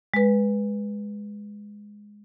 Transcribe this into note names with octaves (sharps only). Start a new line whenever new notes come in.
G#3 B4